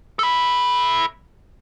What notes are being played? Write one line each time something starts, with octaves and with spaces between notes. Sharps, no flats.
A4 B5